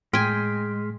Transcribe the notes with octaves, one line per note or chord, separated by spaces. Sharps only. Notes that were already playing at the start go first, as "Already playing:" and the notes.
A2 G#3 G5 G#5 C6 F6 B6